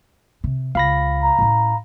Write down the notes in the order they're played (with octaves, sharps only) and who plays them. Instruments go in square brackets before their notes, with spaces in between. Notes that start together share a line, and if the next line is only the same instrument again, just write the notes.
[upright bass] C3
[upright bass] C#2 [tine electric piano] F5 B5 A#6
[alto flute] A#5
[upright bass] A2 C#4